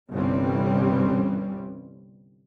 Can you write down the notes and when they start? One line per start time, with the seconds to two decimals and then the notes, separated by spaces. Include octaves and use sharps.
0.11 G1 C2 E3 G3 C4 C#4